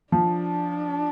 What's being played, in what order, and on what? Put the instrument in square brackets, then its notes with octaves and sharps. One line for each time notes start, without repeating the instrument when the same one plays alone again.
[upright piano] F3 [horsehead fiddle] D4